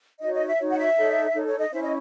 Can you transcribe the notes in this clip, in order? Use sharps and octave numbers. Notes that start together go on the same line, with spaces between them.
D#4 F#4 C#5 D#5
D#5
E5
D#4 F#4 C#5
F#5
E5
D#4 A4 C#5
D#4 A4 C#5
C#5
D#5
C#4 E4 C5 E5
D#5